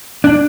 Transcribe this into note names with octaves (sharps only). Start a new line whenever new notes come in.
D4